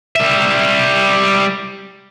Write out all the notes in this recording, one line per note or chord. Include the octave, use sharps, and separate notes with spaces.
G3 E5